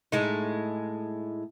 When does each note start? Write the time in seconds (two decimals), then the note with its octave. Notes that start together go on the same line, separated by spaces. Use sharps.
0.12 A2 G#3 D#4